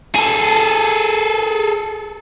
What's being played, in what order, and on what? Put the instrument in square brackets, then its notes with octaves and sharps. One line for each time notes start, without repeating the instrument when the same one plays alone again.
[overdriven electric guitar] G#4 A4